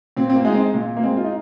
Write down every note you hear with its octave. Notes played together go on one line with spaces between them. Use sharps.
A#2 C4
C4
A#3
G#3 D#4
C4
A#2
A#3
G#3 C4
F4
D#4